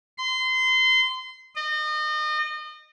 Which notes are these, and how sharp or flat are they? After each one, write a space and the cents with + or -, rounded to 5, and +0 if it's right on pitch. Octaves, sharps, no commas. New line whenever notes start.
C6 -25
D#5 -35